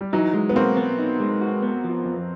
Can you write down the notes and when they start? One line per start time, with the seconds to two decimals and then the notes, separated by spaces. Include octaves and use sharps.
0.01 G3
0.13 E3 F#3 D#4
0.34 G#3
0.49 B3
0.56 A#3 C4 F#4
0.77 B3
0.99 D#4
1.20 G#3
1.41 F#4
1.62 B3
1.84 F3
2.04 F2